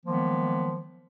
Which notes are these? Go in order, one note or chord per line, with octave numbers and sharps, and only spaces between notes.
D#3 F3 F#3 G#3 A#3 B3